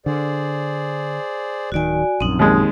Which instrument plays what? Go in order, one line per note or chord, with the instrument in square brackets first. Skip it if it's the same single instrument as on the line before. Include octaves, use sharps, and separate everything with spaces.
[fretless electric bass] D3 [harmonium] G#4 C5 D5
[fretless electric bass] D1 D#3 [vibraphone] F#4 D5 G#5
[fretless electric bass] A#1 F#2 [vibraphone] C4 D#4
[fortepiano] D#2 G#3